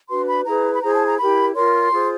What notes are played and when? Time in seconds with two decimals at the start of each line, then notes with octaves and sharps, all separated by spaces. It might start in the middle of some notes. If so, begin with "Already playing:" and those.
0.09 D4 F#4 B4 C6
0.27 B5
0.45 E4 G#4 B4 A#5
0.73 B5
0.82 E4 G#4 C5 A#5
0.94 A5
1.06 A#5
1.19 E4 G4 A#4 B5
1.55 F4 A#4 C#5 C6
1.92 F4 G#4 C5